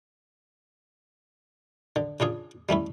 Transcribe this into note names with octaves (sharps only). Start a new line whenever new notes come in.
D3
C#3 D4 F4 G#4
G3 A3 C#4 E4